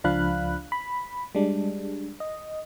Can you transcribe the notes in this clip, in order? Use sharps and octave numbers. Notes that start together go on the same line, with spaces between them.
C#2 F3 D4 F5 B5 F#6
B5
G3 G#3 D4
D#5